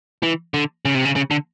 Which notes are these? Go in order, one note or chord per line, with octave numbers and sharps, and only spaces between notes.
E3
D3
C#3
C3
C#3
C#3
D3